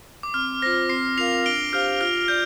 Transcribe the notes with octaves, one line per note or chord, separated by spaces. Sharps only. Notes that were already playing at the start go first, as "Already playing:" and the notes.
D6
C4 F6
F4 C5 A#6
C4 C7
F4 A#4 F5 C7 F7
D4 D7 G7
G4 C5 F5 F6
F4 F6
D5 G6